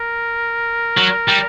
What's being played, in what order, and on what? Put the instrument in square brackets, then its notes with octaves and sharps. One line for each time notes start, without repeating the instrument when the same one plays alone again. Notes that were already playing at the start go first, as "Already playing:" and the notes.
Already playing: [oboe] A#4
[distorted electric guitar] F#3
G3